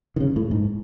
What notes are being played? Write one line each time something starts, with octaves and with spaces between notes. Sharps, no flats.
D#3
C#3
A2
G#2